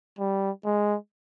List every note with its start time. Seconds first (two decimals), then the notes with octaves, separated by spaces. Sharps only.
0.18 G3
0.64 G#3